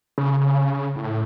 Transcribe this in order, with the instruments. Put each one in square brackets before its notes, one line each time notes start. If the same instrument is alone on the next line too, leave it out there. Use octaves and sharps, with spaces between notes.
[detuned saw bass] C#3
A2